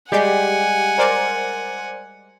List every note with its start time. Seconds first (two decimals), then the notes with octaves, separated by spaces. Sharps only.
0.12 G3 G#3 G4 F#5 G#5
0.98 A#4 C5 D5